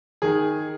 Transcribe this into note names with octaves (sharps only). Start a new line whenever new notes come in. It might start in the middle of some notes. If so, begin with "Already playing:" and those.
D#3 G#4